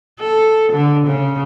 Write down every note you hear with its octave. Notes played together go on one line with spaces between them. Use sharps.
A4
D3
C#3